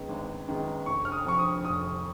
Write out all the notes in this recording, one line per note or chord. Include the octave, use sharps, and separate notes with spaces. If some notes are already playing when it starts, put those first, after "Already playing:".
Already playing: F#2 D#3 G#3 B3
G#1
F#2 D#3 G#3 B3
F1 C#6
F6
D#6
F2 F3 C#6
D#6
F1 D#6